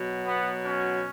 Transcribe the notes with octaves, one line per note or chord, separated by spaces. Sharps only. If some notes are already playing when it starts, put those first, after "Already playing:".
Already playing: B2 F#3
B3
C#4